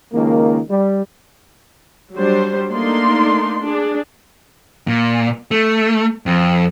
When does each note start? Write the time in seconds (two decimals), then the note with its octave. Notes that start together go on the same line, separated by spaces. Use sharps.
0.14 C#2 D#3 A#3
0.70 G3
2.14 F#3 G3 D4 C5
2.71 A3 A#3 D4 D#4 D5 C6
3.59 D4 G#4
4.87 A#2
5.51 A3
6.26 F2